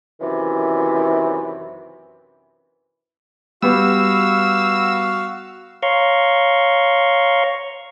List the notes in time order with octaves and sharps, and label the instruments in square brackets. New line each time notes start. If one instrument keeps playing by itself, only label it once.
[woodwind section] F#2 C3 D#3 E3
[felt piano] G3 B3 [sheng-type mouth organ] F#4 F5 [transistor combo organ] E6
[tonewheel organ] C#5 F5 A#5 C6 C#6